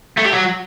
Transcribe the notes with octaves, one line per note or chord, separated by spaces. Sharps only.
A3
G4
F#3